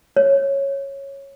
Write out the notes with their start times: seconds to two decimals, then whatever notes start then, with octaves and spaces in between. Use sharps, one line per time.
0.17 C#5